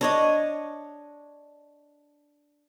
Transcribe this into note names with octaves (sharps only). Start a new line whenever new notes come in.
D4 C#5 D#5